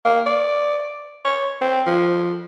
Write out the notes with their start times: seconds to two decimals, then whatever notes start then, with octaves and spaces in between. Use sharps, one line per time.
0.05 A#3
0.26 D5
1.25 C#5
1.61 C4
1.86 F3